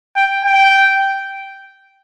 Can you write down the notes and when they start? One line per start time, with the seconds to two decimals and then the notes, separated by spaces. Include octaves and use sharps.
0.16 G5
0.45 G5